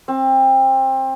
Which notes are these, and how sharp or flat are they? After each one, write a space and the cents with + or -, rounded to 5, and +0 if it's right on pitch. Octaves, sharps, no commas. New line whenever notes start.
C4 +25